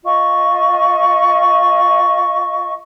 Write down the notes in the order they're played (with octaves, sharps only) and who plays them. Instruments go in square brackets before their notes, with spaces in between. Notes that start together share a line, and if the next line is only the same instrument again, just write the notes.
[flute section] F4 D#5 C#6